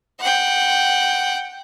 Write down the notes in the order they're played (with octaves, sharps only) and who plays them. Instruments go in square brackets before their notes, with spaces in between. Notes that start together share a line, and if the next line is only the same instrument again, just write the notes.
[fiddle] F#5 G5